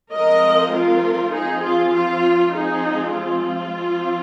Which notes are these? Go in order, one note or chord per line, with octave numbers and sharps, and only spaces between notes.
F3 G#3 C4 A#4 D#5
F4 A#4
F3 C4 D#4 G#4
F4
F4
F3 G#3 C4 D#4 G#4
F4
F3 C4